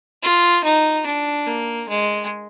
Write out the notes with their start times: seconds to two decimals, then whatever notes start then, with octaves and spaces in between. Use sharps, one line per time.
0.23 F4
0.64 D#4
1.06 D4
1.47 A#3
1.89 G#3